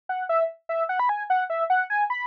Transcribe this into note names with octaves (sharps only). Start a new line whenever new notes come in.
F#5
E5
E5
F#5
B5
G#5
F#5
E5
F#5
G#5
B5